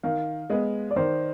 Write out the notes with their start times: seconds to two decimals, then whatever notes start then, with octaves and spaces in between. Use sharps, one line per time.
0.03 D#3 F5
0.50 G#3 B3 D#5
0.91 D5
0.96 D#3 C5